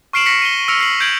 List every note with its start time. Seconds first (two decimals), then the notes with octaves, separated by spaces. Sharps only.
0.13 C#6 F6 C7 D7 E7 F#7
0.26 C#6 A#6 B6 C#7 F#7
0.42 D#7 G7
0.68 E6 F6 A#6 C#7 D7 F7
0.80 C7 F#7
1.00 G6 G#6 D7 F#7